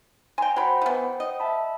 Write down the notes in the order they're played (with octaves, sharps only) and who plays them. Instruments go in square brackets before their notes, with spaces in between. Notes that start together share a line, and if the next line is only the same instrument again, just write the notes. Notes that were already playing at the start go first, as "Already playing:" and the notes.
[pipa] G5 G#5 [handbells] A#5 C6
[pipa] F#3 B5 [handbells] C5 F#5 G5
[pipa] E3 B3
D#5
[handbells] E5 A5 B5